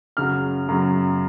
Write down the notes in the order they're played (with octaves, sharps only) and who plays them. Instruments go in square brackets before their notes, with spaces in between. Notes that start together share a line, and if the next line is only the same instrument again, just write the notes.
[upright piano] F#2 C#3 F#3 F6
F#2 C#3 F#3